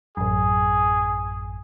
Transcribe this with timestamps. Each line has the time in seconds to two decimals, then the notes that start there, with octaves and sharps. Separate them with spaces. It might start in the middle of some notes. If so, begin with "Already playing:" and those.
0.17 A1 F#2 G#4